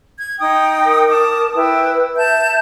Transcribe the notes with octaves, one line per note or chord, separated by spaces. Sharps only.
G#6
D#4 G5 D#6
A#4
A5 D6 D#6
E4 B4 G5
E5 A5 G6